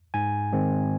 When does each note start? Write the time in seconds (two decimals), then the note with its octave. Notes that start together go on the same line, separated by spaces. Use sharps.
0.14 G#2 G#5
0.52 D#3 G#3 C4